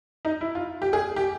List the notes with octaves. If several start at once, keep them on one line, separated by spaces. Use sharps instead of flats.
D#4
E4
F4
G4
G#4
G4